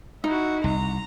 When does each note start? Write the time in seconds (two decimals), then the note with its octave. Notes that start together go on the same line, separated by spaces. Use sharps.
0.24 D#4 E4 F#4
0.64 C2 A#5